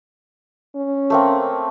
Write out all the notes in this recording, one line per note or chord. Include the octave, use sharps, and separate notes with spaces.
C#4
A3 A#3 C4